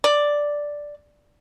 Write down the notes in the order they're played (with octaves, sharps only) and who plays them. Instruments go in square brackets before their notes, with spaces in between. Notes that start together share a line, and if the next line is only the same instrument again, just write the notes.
[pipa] D5